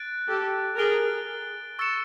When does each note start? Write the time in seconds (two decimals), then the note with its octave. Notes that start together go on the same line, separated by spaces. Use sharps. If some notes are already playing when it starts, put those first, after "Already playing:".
Already playing: F#6 A6 D7
0.28 G4 A4
0.77 G#4 A#4 A6 D7 G7
1.79 C#6 E6 A6 C#7 E7